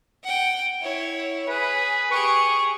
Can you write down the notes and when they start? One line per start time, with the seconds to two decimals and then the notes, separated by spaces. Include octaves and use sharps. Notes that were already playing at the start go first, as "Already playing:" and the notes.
0.24 F#5 G5
0.81 E4 C#5
1.49 G#4 B4
2.11 G4 G#4 C#6